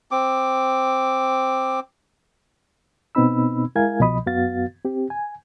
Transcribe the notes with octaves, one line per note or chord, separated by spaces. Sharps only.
C4 D6
B2 B3 C4 D#4 B5 E6
G#3 E4 A#4 F5 G#5 G#6
C2 B2 F3 D#5 B5 D#6
F#2 B3 F#4 F5 A6
C4 G4
G#5